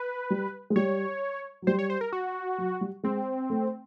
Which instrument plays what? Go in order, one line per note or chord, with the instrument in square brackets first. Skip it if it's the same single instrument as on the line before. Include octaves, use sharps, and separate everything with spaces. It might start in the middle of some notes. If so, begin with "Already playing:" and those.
Already playing: [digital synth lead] B4
[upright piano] G3
G#3
[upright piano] G3 [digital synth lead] C#5
[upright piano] F#3
[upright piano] G3 [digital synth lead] C5
[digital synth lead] C#5
C5
A#4
F#4
[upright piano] F#3
G3
[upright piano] G#3 [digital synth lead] C4
[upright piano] A3